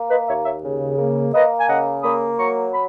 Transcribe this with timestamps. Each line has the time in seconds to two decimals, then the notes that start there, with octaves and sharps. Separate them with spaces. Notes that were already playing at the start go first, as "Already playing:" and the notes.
Already playing: A#3
0.10 B4 D#5
0.28 D#2 C#5 E5
0.45 C#5 E5
0.63 C#3
0.98 A#3
1.33 A#3 B4 D#5
1.60 G#5
1.68 C#3 D#5 F#5
2.03 A#3 B5 D#6
2.38 F#3 A#5 C#6
2.73 B5